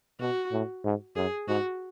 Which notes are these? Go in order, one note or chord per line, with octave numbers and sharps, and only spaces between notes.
B2 F#4
A2
G#2
F#2 G#4
G#2 F#4